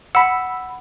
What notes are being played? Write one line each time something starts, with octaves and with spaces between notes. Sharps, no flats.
F#5 B5 E6